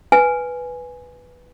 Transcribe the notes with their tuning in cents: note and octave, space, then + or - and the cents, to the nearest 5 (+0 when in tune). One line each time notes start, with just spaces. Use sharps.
B4 +0 G#5 +0